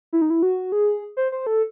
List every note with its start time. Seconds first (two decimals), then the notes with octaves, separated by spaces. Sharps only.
0.13 E4
0.22 D#4
0.30 E4
0.43 F#4
0.72 G#4
1.17 C5
1.32 C5
1.47 A4